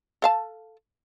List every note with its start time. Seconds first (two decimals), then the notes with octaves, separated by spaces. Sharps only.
0.22 A4 F5 A5